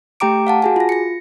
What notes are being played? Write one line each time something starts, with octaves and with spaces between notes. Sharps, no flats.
A3 G4 G5 A#5 D6 D7
F5 F#5 A5
F#4 G#4 G#5
F4 A#6
A#6 C#7